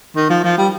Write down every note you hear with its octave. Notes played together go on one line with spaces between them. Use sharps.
D#3
F3
F3
G3